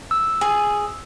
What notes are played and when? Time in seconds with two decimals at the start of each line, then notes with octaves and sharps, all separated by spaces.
0.11 E6
0.41 G#4